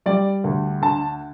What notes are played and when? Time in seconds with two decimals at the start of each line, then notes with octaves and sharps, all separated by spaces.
0.06 G3 D5
0.44 D2
0.82 D3 A5